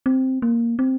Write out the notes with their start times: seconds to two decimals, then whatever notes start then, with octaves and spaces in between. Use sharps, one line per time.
0.06 C4
0.42 A#3
0.79 C4